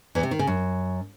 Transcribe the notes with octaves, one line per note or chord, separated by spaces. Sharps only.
E2
C3
D#3
C#3
F#2